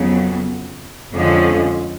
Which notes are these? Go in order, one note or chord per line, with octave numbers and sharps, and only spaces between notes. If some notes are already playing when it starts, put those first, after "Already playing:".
Already playing: F2 C#3 F#3 B3
F2 D3 F3 G#3 C#4